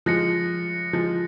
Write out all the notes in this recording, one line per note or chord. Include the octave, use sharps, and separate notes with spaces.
F3 G#3 F#6 A#6 C#7
F3 G#3